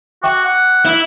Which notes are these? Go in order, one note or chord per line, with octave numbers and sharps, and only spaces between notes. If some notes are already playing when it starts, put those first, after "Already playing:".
F#4 E5 G5 D6
F#5
E4